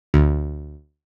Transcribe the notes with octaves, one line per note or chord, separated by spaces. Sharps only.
D2